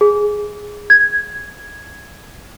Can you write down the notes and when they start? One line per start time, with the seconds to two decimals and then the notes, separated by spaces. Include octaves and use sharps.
0.01 G#4
0.90 G#6